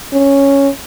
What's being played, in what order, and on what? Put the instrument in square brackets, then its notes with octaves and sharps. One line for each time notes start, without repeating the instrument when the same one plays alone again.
[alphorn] C#4